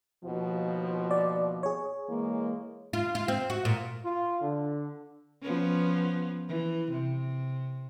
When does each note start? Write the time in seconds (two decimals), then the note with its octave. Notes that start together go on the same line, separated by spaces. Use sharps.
0.24 D#2 B2 F3
1.11 D5
1.63 G#4 C#5
2.09 E3 G#3 A#3
2.93 F4
3.15 F4
3.28 C4
3.50 F#4
3.65 A#2
4.04 F4
4.41 D3
5.42 F3 B3 C#4
6.49 E3
6.91 C3